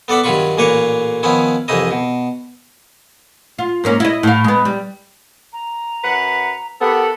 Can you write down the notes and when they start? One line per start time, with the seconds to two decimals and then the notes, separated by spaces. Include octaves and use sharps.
0.08 B3 A4 D5 F#5 B5
0.24 G2 D#3 F#3 F4 B5 C#6
0.57 A1 A#2 A#3 B4 C#5 C#6
1.23 D#3 F3 B3 C#4 E4
1.68 C2 F2 E3 D#4 E4 D#5
1.91 B2
3.59 F4
3.84 G#2 A#3 C#4
4.00 E4 D#5
4.23 A2 F5
4.44 G#3 B3
4.65 G3
5.53 A#5
6.03 F#2 B4 F#5
6.81 B3 G4 A4 A#4 F#5 B5